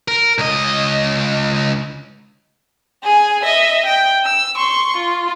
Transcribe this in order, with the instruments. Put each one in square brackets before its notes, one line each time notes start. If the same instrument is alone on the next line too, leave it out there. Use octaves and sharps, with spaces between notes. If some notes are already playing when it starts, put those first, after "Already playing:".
[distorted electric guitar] A#4
C#2 D#5
[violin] G#4 G#5
D#5 E5
G5
E6
C6 C#6
F4